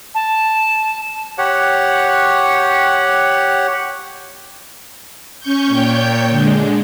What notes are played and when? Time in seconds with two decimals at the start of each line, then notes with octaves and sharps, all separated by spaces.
0.15 A5
1.38 G4 C#5 F#5
5.40 C#4 C#6 G6
5.71 A#2 C#5 G5 G6
6.30 D3 G#3